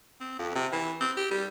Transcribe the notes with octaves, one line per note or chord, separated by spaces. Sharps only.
C4
F2
C3
E3
C4
G4
G3